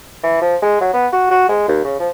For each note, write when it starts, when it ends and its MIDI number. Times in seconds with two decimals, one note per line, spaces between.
0.23 0.38 52
0.41 0.56 53
0.62 0.77 56
0.80 0.93 54
0.93 1.07 59
1.13 1.27 66
1.30 1.47 66
1.49 1.66 56
1.68 1.83 39
1.84 1.96 49
2.00 2.09 53